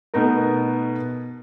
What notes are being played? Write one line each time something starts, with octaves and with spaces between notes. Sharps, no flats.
B2 A3 B3 D#4 A#4